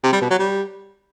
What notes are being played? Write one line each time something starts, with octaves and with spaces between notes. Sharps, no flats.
C3
G3
B2
F#3
G3